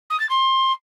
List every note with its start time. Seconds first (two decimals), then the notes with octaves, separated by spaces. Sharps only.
0.10 D#6
0.20 A6
0.30 C6